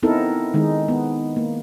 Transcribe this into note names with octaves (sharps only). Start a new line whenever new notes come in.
B3 C4 D#4 E4 A4 A#4
D#3 G#3 D#4
B3
A#3